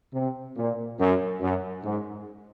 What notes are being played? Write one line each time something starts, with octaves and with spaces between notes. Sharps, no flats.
C3
A#2
F#2
F#2
G#2